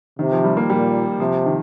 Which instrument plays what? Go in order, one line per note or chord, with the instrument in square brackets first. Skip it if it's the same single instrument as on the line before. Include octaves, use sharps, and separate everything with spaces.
[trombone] C3 [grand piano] D#3
[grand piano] F3
G3
A#3
[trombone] A#2 [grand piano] G3
[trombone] C3 [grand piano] F3
[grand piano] D#3